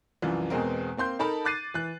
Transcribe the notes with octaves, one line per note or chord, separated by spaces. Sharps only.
C2 F#2 E3 F3
E2 B2 G#3 C4 A#4
A#3 C4 C6 G6
D#4 A4 A#4 A5 B5
D6 F#6 A6 C7 D#7
E3 F#6